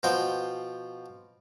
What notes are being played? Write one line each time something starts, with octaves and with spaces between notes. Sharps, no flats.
B2 F3 C5 G5